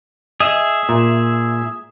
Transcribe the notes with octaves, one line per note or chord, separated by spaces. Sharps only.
G#4 D#5 E5
A#2